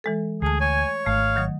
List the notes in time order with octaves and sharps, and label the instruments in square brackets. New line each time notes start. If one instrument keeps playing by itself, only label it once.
[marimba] E3 G#3 A4
[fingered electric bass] D2 [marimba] A3 A5 [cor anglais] G#4
[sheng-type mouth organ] C#5 [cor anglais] G#5
[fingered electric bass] G#1 [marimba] A3 F6 [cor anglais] F5
[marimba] D#3 F#3 D#6